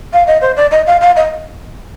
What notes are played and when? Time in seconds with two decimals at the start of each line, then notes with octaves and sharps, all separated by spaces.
0.13 F5
0.27 D#5
0.41 C5
0.56 D5
0.71 D#5
0.87 F5
1.01 F5
1.16 D#5